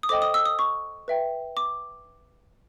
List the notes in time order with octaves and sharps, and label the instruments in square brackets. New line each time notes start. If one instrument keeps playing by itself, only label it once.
[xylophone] D#6
A4 C5 D#5 G5 D6
D#6
E6
D#6
C#6
B4 E5 G5
D6